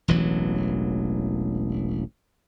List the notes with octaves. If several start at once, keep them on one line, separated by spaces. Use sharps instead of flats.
E1 A1 E3 F#3